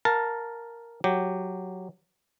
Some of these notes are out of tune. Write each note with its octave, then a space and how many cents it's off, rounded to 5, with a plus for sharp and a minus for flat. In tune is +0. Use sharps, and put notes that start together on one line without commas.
A#4 +0 F5 +40 A5 +0
F#3 +0 G4 +0